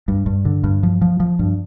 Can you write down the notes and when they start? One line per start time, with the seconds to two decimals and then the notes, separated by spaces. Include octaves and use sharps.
0.08 G2
0.26 G2
0.45 D3
0.64 G2
0.83 F3
1.02 F3
1.20 F3
1.39 G2